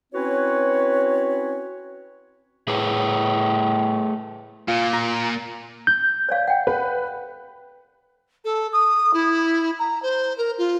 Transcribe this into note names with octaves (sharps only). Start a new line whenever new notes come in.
C4 C#4 E4 F#4 B4 C#5
A2 A3 G#4 B4
A#2 F4
A#5
G6
C#5 D5 F5
F#5 G5
B4
A4
D#6
E4
A#5
C5
A#4
F4